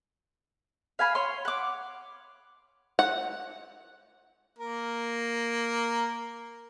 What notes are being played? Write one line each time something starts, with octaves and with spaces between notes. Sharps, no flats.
F5 G#5 B5
C#5 C6
F#5 D6
F#5
A#3 A#4